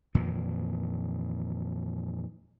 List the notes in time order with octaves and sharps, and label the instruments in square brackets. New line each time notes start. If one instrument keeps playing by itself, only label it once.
[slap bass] F2 A#2 D#3 E3